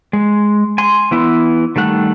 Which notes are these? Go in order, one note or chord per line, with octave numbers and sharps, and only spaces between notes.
G#3
G#5 C6
E3 B3 E4
D#3 G3 A3 F#5